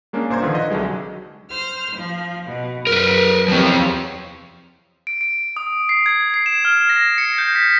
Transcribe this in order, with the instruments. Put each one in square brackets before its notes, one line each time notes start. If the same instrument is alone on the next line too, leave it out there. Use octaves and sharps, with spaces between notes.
[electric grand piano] G#3 A#3 C#4 D4
G1 A#2 C5 A#5 C6 G#6
D3 D#3 F3 B4
D#5
C2 D3 F#3 G#3
[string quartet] C5 F6
F3
B2
[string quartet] F#2 [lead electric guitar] A#4 B4
[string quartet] E2 C3 C#5 [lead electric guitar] F3 C4
[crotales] D7
D7
D#6
C7
G#6
C7
E7
F6
A#6
C#7
G6
B6